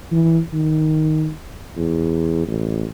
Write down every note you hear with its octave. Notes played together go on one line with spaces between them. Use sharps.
E3
D#3
E2
A1